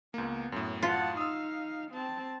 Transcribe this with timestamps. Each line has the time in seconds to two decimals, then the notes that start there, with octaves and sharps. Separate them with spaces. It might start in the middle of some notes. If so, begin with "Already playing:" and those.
0.14 C#2 A#3 B3
0.52 F#2 A2
0.82 F4 F#5 A5
1.17 D#4 F5 D#6 E6
1.91 C4 A5